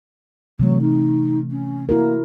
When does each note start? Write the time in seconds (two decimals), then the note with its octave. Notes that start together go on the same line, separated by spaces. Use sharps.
0.60 C3 E3 F#3 A3
0.81 D#4
1.51 C#4
1.89 A#3 E4 F#4 A#4